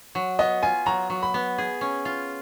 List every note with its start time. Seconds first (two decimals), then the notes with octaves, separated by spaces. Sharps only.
0.15 F#3
0.39 B3 D#5
0.63 F4 G#5
0.86 F#3 A#5
1.10 F#3
1.23 B5
1.34 B3
1.58 G#4
1.81 C#4
2.05 F4